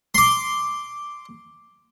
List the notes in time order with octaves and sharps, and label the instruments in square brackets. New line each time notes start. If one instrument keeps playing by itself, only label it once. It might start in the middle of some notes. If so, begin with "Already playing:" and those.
[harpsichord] C6 D6